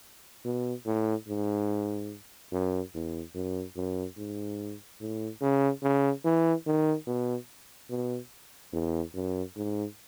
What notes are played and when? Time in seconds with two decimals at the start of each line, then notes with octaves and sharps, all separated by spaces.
0.45 B2
0.86 A2
1.28 G#2
2.52 F#2
2.94 E2
3.35 F#2
3.76 F#2
4.17 G#2
5.01 A2
5.41 C#3
5.83 C#3
6.25 E3
6.67 D#3
7.07 B2
7.90 B2
8.73 E2
9.14 F#2
9.56 G#2